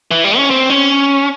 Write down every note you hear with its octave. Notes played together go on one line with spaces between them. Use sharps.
E3
G3
C#4
C4
C#4